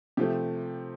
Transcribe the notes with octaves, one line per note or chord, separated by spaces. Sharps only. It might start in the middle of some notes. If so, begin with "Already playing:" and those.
C3 F3 A3 G4